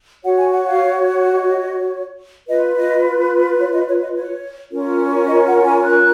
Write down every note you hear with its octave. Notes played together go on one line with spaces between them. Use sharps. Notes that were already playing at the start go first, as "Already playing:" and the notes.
F#4 C#5 F#5
G#5
F#5
F5
D#5
F4 B4 D#5
D#5
C#5
D#5
C#5
D#5
C#5
C#4 F4 A#4
D#5
F#5
G#5
F#6